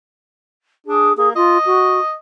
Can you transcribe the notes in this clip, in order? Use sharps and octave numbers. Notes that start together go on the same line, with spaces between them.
D4 G#4
A#3 G#4
F4 D#5
F#4